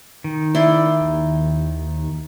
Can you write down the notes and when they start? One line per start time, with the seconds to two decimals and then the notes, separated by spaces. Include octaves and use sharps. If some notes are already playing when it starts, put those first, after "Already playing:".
0.24 D#3
0.55 E4 D5 C6
1.01 D#2